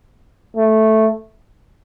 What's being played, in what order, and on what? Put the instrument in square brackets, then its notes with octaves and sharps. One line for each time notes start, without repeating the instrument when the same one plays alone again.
[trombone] A3